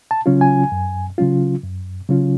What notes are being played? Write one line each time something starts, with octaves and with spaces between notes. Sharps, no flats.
A5
C#3 F#3 C#4 F4
G#5
F#2
C#3 F#3 C#4 F4
F#2
C#3 F#3 C#4 F4